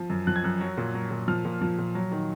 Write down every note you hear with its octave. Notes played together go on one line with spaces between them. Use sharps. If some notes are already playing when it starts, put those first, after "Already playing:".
Already playing: F3
F#2
F3 F#6
G#6
F#2 F#6
F#3
A#2
F#3
A#2
F3 F6
A#2
F3
A#2
F#3
D#3